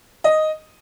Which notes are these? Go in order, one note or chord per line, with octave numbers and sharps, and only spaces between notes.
D#5